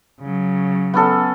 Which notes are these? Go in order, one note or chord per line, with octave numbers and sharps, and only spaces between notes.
C#3 F#3
B3 C#4 A4